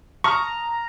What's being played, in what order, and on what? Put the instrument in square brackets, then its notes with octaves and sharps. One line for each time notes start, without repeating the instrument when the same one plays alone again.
[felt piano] A5 D#6 F6 [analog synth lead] A#5 [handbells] C#6